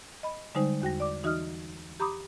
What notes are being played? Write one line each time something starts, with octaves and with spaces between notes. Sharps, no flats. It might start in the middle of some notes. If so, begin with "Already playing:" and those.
D#5 B5
D3 G3 G#3 D#4 C5
E2 F#4 G5 A#6
D5 D6
E3 D#4 F#4 D#5 D#6 F6
G4 A#5 B5 D6 D#6